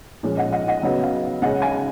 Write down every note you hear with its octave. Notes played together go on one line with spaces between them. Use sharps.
A#2 F3 G#3 C#4
D#5 F#5
D#5 F#5
D#5 F#5
C#3 F#3 B3 D#5
F5
C#3 G#3 C#4 D#5 F#5
F5 G#5